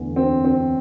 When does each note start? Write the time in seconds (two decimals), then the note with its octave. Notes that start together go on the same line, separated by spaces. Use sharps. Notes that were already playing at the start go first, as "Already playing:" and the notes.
Already playing: E2 D3 A3
0.16 C4
0.45 C4